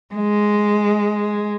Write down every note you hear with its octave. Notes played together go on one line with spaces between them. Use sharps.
G#3